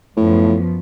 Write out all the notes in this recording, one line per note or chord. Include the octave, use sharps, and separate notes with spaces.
F#2 A2 F3 B3